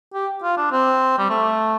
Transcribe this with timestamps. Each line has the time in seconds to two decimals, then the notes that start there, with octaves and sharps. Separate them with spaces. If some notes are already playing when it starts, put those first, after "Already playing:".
0.14 G4
0.43 F4
0.57 D4
0.71 C4
1.18 G3
1.30 A3